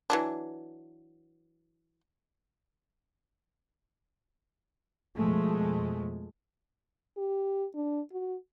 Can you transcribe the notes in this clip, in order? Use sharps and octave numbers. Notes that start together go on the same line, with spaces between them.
E3 F#3 D4
F2 B2 F3 G#3 A3
G4
D4
F#4